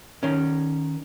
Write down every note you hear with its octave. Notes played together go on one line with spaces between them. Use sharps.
D#3 C#4